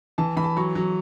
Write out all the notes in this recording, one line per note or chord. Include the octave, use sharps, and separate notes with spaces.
E3 A5
E3 B5
A5
F#3 C#6
F#3